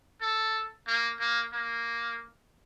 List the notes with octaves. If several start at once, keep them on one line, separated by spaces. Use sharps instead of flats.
A4
A#3
A#3
A#3